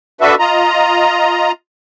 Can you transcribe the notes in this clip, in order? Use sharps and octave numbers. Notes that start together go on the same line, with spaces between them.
D4 F#4 A4 B4 E5
F4 D#5 A#5